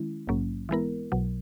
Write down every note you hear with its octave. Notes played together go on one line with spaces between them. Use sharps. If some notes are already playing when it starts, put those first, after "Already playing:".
Already playing: D#3 G#3 C#4 E4
A#1 G#2 F#3 A#3 C#4
E3 G#3 B3 E4 A#4
B1 B2 F#3